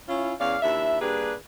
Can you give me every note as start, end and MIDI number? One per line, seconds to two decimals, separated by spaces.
0.08 0.34 61
0.08 0.34 64
0.08 0.34 65
0.40 0.57 40
0.40 0.57 61
0.40 0.57 74
0.40 0.57 77
0.62 0.97 39
0.62 0.97 62
0.62 0.97 64
0.62 0.97 76
1.01 1.33 43
1.01 1.33 58
1.01 1.33 62
1.01 1.33 67
1.01 1.33 68
1.01 1.33 71